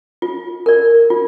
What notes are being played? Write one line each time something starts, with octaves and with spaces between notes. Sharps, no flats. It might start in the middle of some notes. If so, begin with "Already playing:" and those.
F4
A#4 D5
F4